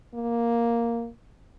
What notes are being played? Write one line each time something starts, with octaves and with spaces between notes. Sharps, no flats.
A#3